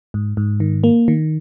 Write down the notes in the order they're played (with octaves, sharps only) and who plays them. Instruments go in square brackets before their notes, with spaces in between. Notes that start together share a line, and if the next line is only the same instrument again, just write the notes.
[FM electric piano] G#2
G#2
D#3
A#3
D#3